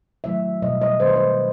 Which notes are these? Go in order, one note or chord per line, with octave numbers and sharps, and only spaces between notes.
D#3 F#3 A3 E5
B2 G3 D#5
D#5
D#3 A3 C5
B4
C5